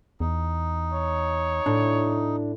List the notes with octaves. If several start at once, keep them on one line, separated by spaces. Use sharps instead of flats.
E2 D#4
C#5
A2 D4